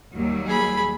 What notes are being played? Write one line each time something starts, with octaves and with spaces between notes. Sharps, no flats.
D#2 F#3 G3
G#4 B5